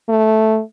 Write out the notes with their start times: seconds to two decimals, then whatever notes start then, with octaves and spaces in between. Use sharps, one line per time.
0.09 A3